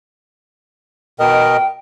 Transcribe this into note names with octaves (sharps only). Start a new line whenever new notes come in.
B2 A#4 D#5 G5